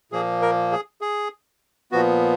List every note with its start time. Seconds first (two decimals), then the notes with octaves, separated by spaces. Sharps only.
0.12 A#2 F3 A#3 G#4
0.42 A#4
0.72 G#4
1.01 G#4
1.92 A#2 F3 B3 F#4